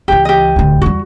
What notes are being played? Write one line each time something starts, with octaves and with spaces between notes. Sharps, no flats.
C#2 E3 G4 G5
G4 D#5
D1 D2
E2 G3 F#4